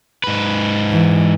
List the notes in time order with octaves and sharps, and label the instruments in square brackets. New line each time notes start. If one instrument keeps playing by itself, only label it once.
[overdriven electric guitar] G#2 B4
[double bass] E3